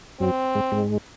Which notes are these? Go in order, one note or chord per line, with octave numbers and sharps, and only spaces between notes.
F#2 F#3 C4
G#2 G#3
G#2 G#3